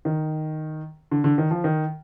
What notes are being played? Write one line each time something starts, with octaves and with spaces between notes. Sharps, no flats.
D#3
D3
D3
D#3
F3
D#3